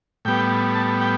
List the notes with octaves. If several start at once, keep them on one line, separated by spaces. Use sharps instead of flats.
A2 G3 B3 G5
A5
G5